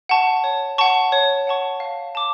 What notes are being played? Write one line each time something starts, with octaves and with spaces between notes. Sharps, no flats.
F#5 A5 C#6
C#5
F#5 A5 C#6
C#5
F#5 A5 C#6
F5
A5 D6